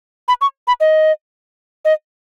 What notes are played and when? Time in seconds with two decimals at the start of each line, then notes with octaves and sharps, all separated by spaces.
0.28 B5
0.41 C#6
0.68 B5
0.81 D#5
1.85 D#5